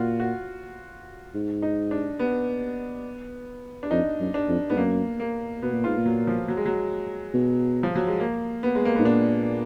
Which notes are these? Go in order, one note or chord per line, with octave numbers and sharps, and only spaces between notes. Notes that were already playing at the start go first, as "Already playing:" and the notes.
Already playing: A#2 F4 F#4
F#4
G#2
D#4
D4
B3
D4
F2 D#4
F#2
D4
F2
G#2 B3
F#2 A#3
A#3
B2 B3
A#2
G#2 F4
A#2
F#3
F3
F#3
G#3
F#3
B2
F3
F#3
G#3
A#3
B3
G#3
A#3
G#2 B3
A#2 D4